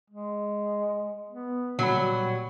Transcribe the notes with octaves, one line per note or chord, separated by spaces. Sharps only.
G#3
B3
A#2 F#3 G3 B5